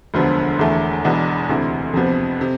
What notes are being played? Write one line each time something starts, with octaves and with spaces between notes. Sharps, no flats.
E1 D2 D3 F3 B3
E1 E2 D3 A3
E1 E2 B2 B3 D4
D2 C3 E3
F2 C3 F3 B3
C3